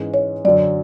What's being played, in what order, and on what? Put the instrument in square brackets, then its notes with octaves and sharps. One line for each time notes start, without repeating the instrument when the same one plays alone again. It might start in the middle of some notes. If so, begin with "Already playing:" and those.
Already playing: [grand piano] G#2 E3 G#3 C#4 G#4
[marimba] C#5
[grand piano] F#2 D3 F#3 [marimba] D5